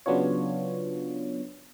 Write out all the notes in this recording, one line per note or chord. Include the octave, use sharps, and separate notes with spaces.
C#3 F#3 B3 D4 F4 C#5